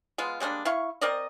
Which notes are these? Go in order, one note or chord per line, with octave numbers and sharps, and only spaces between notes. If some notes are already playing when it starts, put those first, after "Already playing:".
G#3 B3 F4
G3 G#3 A#3 D4
E4 F5 C#6
C4 A#4 D5 D#5